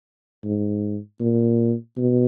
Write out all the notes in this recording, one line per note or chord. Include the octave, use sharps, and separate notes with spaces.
G#2
A#2
B2